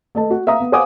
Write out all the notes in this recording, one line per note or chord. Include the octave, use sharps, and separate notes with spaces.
A3 D#5 A5
F#4
E5 F5 A#5 D#6
B3
C5 F5 F#5 G#5 D6 D#6